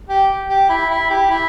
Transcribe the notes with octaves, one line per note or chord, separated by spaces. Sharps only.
G4
G4
E4
E4
G4
E4